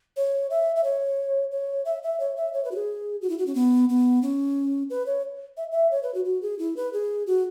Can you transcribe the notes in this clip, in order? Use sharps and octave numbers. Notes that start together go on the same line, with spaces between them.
C#5
E5
E5
C#5
C#5
E5
E5
C#5
E5
C#5
B4
F#4
G#4
F#4
E4
F#4
C#4
B3
B3
C#4
B4
C#5
E5
E5
C#5
B4
F#4
F#4
G#4
E4
B4
G#4
F#4